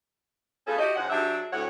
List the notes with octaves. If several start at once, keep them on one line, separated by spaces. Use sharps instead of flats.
A3 B3 C#4 F4 G#4 A4
E4 F#4 G4 D#5
G#2 F3 C#4 D#4 F#5
F#3 D4 G4 G#4 E5
D2 A2 C#5 F#5